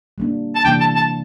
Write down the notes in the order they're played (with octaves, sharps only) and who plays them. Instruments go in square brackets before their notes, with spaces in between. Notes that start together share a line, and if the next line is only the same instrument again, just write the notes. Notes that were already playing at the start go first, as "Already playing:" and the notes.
[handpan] G3 A#3 D4
[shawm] A5
[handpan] C3 E3 G3 A#3 D4 [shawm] G5
[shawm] A5
A5